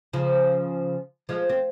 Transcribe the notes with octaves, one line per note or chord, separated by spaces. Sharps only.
C#3 F3
F3 G#3
C4